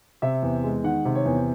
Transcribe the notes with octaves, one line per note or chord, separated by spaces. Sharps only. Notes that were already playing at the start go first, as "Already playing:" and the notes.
C3 E5
E2
G#3
D#3 F#5
C3
C#5
E2